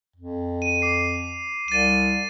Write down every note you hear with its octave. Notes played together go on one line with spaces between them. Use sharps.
F2
D#7
D6 C7
C2 A6 D#7